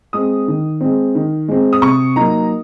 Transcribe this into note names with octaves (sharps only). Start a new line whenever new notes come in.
G#3 C4 D#6
D#3
G#3 C4
D#3
G#3 C4
D#6
C3 C#6
F#3 A#3 D#4 A#5